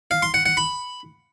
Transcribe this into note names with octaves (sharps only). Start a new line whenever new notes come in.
F5
C6
F#5
F#5
B5